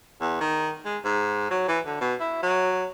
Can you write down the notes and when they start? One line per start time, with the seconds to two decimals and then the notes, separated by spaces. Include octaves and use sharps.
0.21 E2
0.41 D#3
0.85 G#3
1.04 G#2
1.51 F#3
1.68 E3
1.86 D3
2.01 B2
2.20 E4
2.42 F#3